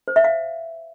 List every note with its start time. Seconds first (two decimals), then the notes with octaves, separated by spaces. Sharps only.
0.08 C5
0.16 E5
0.24 F5